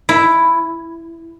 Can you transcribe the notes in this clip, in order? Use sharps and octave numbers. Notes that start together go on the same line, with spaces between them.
E4